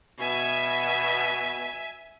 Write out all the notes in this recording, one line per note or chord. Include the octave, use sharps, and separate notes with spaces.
B2 E5 G#5